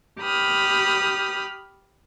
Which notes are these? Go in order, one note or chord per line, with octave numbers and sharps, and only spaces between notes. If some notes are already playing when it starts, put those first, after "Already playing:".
G4 B5 D#6 F6